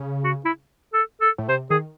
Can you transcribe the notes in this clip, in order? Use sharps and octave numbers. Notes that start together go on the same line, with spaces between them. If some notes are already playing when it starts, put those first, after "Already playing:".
Already playing: C#3
F#4
E4
A4
A4
A2
C3 C5
D#3 G#4